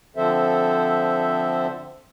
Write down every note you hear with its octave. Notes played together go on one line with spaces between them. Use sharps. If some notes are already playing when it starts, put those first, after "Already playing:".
D3 F3 C4 A4 C5 E5